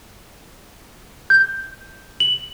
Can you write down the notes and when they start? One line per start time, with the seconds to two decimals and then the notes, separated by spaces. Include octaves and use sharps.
1.30 G6
2.20 F#7